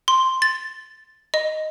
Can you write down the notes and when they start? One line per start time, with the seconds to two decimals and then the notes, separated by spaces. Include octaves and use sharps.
0.08 C6
0.42 A6
1.34 D#5